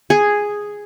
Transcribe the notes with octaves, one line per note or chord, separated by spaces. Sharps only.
G#4